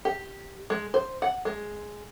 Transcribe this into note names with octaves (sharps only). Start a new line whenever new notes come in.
G4
G#3
C5
F#5
G#3